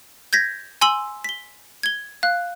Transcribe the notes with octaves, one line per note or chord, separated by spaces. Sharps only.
G6 G#6 A#6 B6
G#5 C6 E6 F#7
B6 G7
G#6 G7
F5 F#6